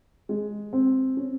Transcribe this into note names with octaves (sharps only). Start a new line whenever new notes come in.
G#3
C4
C#4